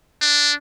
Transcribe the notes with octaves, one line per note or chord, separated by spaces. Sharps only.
D4